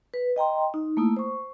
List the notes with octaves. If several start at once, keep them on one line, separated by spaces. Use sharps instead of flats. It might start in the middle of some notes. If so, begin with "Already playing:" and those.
B4
D#5 G5 A#5 C6
D#4
A3 A#3 E4 D#6
C5 C#6